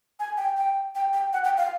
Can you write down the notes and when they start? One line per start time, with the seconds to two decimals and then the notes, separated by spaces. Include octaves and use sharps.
0.20 G#5
0.37 G5
0.57 G5
0.95 G5
1.13 G5
1.33 F#5
1.44 G5
1.58 F5